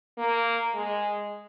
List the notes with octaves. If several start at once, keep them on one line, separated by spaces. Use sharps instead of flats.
A#3
G#3